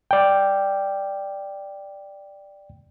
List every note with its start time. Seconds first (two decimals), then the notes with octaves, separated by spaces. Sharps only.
0.11 D5 G5